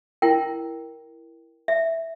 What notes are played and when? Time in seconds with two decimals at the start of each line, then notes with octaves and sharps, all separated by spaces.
0.22 E4 A#4 G5
1.68 E5